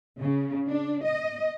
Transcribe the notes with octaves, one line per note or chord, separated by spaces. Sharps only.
C#3
D4
D#5